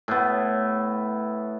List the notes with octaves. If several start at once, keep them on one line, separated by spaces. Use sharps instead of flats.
A2 B3